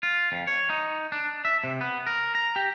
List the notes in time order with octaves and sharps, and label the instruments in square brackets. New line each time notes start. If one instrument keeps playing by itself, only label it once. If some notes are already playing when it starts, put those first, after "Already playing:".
[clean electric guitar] F4
F2
C#5
D#4
D4
E5
C3
B3
A#4
A#5
G4